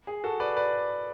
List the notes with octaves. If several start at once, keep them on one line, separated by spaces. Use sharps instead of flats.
G#4
F#4 A4
B4 D5
B4 D5